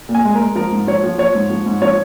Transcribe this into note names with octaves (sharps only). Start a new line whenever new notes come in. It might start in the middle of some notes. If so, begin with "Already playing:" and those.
A#2
G#5
G#3
A#4
G#3
F3 A#4
G#2
F3 C#5
F3
F3 C#5
G#2
F3
G#2
F3 C#5